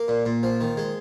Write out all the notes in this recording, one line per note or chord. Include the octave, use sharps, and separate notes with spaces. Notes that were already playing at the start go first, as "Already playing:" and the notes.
Already playing: A#3 A#4
A#2
A#2
F3
D#3
G#3